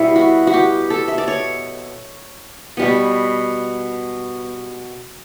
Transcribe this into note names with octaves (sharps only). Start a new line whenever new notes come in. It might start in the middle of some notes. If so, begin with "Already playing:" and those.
Already playing: B2 G3 B3 E4
F#4
F#4
G4
A4
E5
D5
C#5
B2 G3 B3